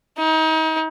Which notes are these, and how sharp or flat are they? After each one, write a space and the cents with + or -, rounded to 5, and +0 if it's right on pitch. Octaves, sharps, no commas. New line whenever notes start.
D#4 +35